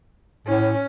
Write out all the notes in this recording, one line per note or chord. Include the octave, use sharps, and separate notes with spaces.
A2 C#4